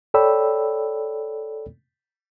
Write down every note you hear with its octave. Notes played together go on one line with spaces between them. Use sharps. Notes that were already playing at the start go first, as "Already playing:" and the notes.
A4 C#5 D5 G5 B5 E6